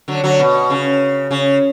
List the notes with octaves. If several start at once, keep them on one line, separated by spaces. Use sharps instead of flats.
D3 F#3
D3 F#3
B2
C#3
C#3